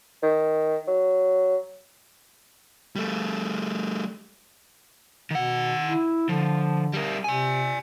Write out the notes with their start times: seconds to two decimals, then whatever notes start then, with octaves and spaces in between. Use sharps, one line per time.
0.22 D#3
0.87 F#3
2.96 G3 A3
5.31 B2 D#3 F#5
5.83 E4
6.29 D3 F3
6.93 G3 A#4
7.24 C3 D5 G#5